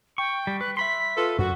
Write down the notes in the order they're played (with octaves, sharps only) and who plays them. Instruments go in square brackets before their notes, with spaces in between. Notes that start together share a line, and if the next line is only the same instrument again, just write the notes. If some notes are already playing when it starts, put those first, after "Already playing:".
[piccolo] G5 [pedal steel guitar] C#6
[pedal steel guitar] G3
[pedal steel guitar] B4 [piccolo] F#6
[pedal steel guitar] E5 B5 C6 [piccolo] B6
[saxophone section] F4 A4 B4
[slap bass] F#2 [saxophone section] F#4 [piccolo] C#6